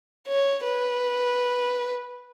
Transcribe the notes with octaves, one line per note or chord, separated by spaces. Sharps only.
C#5
B4